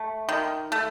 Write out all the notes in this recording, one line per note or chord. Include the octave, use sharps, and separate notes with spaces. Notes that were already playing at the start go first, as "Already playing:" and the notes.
Already playing: A3
D#3
A3